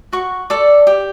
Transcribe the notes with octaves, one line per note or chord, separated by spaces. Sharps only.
F#4 C#6
A4 D5
G4